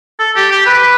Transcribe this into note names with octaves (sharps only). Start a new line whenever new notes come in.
A4
G4
G4
B4